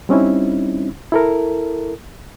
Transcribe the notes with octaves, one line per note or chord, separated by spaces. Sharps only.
G3 C4 C#4 D#4 E4
E4 A4 A#4